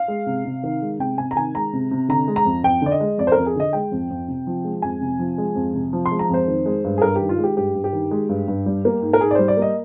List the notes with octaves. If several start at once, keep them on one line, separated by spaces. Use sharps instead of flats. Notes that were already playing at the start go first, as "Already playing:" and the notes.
Already playing: F5
G#3
C3
C3
D#3
G#3
C3 G5
C3 G#5
A#5
D#3 G#5
G#3 A#5
C3
C3
D3 A#5
G#3
A#5
F2
F2 G5
D3 D5
D#5
G#3
F2 D5
C5
A#4
F2
G#4
D3 D#5
G#3 G5
F2
F2
C3
F3
G#3
F2 G#5
C3
F3
G#3
F2
C3
F3
C6
G#3
A#5
F2 C5
D#3
G#3
G2
G#4
G2 A#4
D#3 G4
F4
G#3
G4
G2 G4
G2
G4
D#3
G#3
G2
G2
G3
A#3
G#2
A#4
G#2 G#4
D5
G3 C5
D5
A#3 D#5